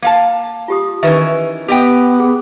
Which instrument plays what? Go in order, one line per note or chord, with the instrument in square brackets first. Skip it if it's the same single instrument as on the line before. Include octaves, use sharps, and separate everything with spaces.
[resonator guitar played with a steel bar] A#3 F5 A5
[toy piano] F4 G4 D#6
[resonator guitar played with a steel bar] D#3 E3 C#4 [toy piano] B4 E5
[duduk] B3 [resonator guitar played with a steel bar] G4 D#5 G5
[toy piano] G#4